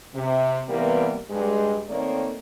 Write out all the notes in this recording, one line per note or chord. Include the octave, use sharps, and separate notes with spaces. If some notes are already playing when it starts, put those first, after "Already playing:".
C3
C3 E3 G3 A#3 B3 A#4
G2 G#3
D#3 A3 A#3 C4 C#5 D5